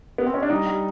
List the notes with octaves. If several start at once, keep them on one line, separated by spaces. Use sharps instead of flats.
B3
C4
C#4
D4
G3 D#4
G3